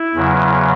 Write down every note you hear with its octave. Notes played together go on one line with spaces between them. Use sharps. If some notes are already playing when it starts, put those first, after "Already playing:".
Already playing: E4
E2 C#3 F#3